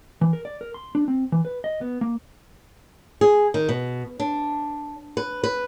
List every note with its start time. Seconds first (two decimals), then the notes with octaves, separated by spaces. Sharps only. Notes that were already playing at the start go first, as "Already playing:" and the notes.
0.21 E3
0.33 A#4
0.45 D5
0.61 A#4
0.74 C6
0.95 D4
1.08 C4
1.32 E3
1.45 B4
1.64 D#5
1.81 B3
2.01 A#3
3.21 G#4
3.54 D#3
3.69 B2
4.20 D4
5.17 B4
5.44 B4